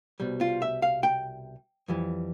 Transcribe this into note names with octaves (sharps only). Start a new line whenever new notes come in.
C2 B2 G3
F4
E5
F5
G5
F2 E3 G3